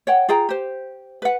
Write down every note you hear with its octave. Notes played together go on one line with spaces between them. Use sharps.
C#5 F#5 G5
F4 G#4 G5 A#5
G4 C5
B4 F#5